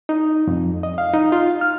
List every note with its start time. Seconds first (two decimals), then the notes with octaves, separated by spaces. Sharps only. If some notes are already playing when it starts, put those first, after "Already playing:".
0.09 D#4
0.47 F2
0.83 D#5
0.98 F5
1.13 D#4
1.32 F4
1.61 F6